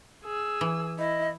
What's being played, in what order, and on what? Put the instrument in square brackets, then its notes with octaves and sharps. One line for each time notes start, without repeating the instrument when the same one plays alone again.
[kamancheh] G#4 E6
[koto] E3
[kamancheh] E4 [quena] D#5